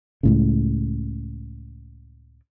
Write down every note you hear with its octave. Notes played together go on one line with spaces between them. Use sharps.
C#2 A2 C#3